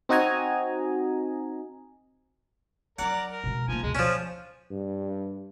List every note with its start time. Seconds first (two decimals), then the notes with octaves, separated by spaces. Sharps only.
0.09 C4 D#4 F#4 D#5 G#5 A#5
2.99 F#3 D#4 A#4 D5 F#5 A#5
3.31 A#4
3.44 B2 G#3
3.68 F3 A#3 D#4 G#5
3.83 D2 B2 G#3
3.95 F3 C#4 D4
4.71 G2